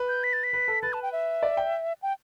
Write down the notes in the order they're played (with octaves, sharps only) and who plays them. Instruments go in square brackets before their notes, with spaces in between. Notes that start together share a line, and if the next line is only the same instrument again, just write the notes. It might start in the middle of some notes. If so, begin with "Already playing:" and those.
Already playing: [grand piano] B4
[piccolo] G6
B6
A6
B6
[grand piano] B4
A4
[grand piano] B4 [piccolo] A6
[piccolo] A5
G5
E5
[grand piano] D5
G5
[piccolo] G5